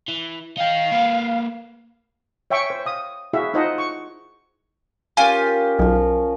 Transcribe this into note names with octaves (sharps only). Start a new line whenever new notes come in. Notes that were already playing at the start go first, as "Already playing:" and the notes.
E3
D#4 F5 G5
A#3 B4
C#5 E5 G5 G#5 C#6
C5
F5 D#6
E4 F#4 G#4 E5 F5
D#4 F4 C5 D#5 F#5 A5
C#6
C#4 F4 G4 A#4 G#5
B1 F3 A#4